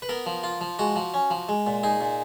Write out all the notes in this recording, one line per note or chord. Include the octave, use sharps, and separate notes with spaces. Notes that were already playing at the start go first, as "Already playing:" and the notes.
B4
B3 A#4
F3
F4
F3
G#3 F#4
F3
C#4
F3
G#3
A#2
D#4 G#4
A#2